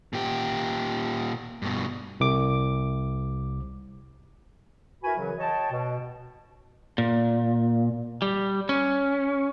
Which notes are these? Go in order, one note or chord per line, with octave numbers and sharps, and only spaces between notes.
A#2 G4
G2 B2
C2 D6
E4 F#4 A#4 B4 G#5 B5
F#2 C#3 E3 F#3
C#5 D#5 G5 A5
B2
A#2
G3
C#4